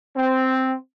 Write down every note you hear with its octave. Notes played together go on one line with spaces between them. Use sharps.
C4